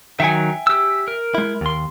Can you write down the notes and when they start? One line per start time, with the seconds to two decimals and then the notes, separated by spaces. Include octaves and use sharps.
0.20 D#3 F#3 E5 G5 G#5
0.67 G4 E6
1.08 A#4
1.35 G#3 E4
1.61 D#2 C6